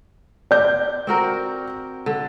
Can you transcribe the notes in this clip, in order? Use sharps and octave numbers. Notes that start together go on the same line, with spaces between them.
D5 G6
C4 F#4 A#4
D3